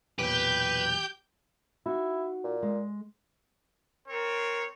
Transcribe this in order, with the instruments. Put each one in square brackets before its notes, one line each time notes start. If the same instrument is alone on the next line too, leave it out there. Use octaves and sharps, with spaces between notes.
[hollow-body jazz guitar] B1 E2 A#2 [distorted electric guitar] G4 [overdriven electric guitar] B4 [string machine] G6
[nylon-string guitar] D#4 F#4 [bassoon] E4
[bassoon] A#2
[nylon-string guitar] G#3
[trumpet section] C4 C#5 [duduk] A#4